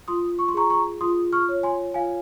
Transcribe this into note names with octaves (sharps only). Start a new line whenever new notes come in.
F4 C6 D#6
C#6
C6
G#4 A#5 C#6
A#5 C#6
F4 C6 D#6
C#6 F6
C#5
G#5 C6
F4 F5 G#5